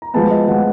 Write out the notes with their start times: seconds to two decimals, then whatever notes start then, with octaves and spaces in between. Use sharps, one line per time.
0.02 A#5
0.14 F3 G#3 B3 A5
0.31 D#5
0.48 F3 G#3 B3 F#5